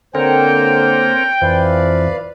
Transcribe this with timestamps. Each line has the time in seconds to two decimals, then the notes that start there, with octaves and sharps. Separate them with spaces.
0.15 D3 A#3 C4 A#4 C5 C#5 G5
1.42 F2 E3 F3 B4 D5 F5